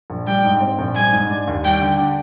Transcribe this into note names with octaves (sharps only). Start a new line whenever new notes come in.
A#1
G3 G5
G#2
C4
A#1
G3 G#5
G#2
D4
D#2
G3 G5
D3
D4